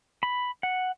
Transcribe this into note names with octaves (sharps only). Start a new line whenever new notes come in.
B5
F#5